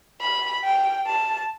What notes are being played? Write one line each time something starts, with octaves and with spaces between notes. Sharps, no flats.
B5
G5
A5